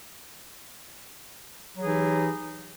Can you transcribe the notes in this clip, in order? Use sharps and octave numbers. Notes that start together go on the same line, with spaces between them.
E3 F#3 D#4 G4 G#4